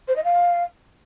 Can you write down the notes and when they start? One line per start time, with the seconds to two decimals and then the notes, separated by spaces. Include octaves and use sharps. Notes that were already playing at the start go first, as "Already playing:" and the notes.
0.08 C5
0.16 D#5
0.24 F5